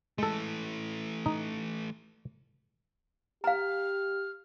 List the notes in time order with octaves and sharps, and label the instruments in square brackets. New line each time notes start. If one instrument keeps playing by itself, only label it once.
[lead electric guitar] E3 A3 [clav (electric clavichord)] G#3 A4
[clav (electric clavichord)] D#4
[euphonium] G4 [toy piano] F5 A#5 [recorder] F6